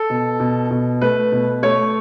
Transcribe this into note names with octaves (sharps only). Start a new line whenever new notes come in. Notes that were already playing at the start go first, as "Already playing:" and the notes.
Already playing: A4
B2
B2
B2
A3 B4
B2
A3 C#5